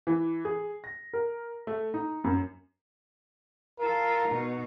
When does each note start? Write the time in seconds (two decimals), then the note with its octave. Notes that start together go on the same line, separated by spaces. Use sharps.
0.07 E3
0.45 G#4
0.84 A#6
1.13 A#4
1.67 A3
1.94 D#4
2.24 F#2
3.80 F4 A4 A#4
4.28 B2 D#4